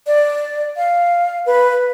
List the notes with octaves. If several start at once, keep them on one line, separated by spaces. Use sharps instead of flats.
D5
F5
B4